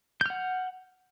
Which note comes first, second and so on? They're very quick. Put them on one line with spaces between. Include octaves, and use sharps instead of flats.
G6 F6 F#5